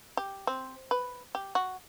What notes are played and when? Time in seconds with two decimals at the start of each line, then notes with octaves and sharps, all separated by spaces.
0.17 G4
0.47 C4
0.91 B4
1.35 G4
1.55 F#4